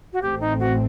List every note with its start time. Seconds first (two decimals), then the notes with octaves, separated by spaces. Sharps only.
0.13 F#4
0.22 A1 A2 A3 C4 G4
0.40 D#4
0.60 F#4